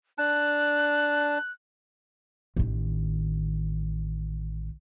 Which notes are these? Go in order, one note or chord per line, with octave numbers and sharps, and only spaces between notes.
D4 A5 F#6
A1 D#3